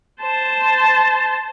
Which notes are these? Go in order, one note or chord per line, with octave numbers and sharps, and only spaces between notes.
C5 A5